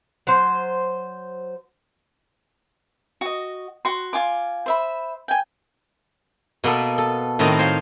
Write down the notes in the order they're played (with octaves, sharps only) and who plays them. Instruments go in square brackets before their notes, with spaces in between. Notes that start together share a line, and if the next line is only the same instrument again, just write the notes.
[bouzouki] F#3 C5
[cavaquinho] F#4 D#5
F#4 C6
F4 G#5 D6
C5 E5 B5
G5 G#5
[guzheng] B2 A#3 B3 A4
A4
A2 D#3 C4 D#4 F#4
C5 C#5 F5